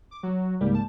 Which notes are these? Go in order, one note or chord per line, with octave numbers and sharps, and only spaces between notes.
D6
F#3
C#2 G#2 G3 A#3
A5